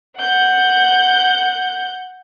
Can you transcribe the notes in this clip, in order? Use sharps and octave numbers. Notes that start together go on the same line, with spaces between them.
F#5 G6